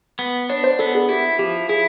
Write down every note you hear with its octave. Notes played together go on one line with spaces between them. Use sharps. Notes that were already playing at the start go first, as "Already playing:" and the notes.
B3
D4 C#5
C5
B3 A4
G#4
E4 G4
F3 G4
E4 G#4